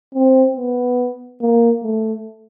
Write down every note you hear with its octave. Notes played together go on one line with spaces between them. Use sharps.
C4
B3
A#3
A3